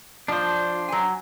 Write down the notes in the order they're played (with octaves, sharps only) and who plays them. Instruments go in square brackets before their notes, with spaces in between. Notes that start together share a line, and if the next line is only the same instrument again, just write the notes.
[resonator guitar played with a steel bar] F3 [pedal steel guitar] D4 C5
[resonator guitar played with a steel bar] F#3 G#5